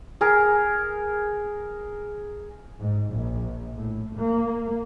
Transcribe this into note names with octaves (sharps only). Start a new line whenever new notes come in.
G#4 A#4
G#2
A#1
A2
A#3